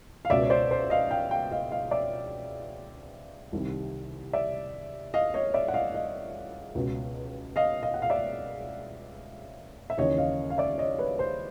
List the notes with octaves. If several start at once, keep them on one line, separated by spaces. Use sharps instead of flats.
F5
C#2 B2 D5 E5
C#5
C5 D5
C5
D#5 F5
F5 G5
F5 G5
D#5 F5
D#5 F5
D5 E5
C2 C3 D#3
D5 E5
D#5 F5
C#5 D#5
D5 E5
F#5
D#5 F5
D#5 F5
C#2 B2
D#5 F5
D#5 F5
F#5
F5
D5 E5
E5
D#2 C#3 E3 C#5 D#5
D#5 F5
F5
D5 E5
C#5 D#5
B4 C#5
C5